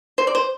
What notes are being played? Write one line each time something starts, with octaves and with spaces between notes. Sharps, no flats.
C5
D5
C5